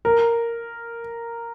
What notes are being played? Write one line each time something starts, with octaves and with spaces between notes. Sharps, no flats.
A#4